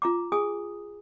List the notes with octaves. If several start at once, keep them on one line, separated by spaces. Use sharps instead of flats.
F4 A#5 D6
G#4 G#5 D#6